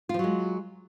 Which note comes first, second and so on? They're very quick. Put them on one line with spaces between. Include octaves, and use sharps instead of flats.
F4 F3 F#3 G#3